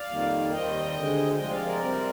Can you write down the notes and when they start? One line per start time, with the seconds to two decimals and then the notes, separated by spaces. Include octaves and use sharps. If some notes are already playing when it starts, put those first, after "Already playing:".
Already playing: D5 F5
0.10 F2 D#3 G3 A#3
0.52 D#2 D#3 G3 C4 D#5 G5
0.95 D2 D3 G#3
1.37 C3 F3 G#3 C4 D#5 G5
1.51 D5 F5
1.66 A#4 D5
1.80 C3 G3 C4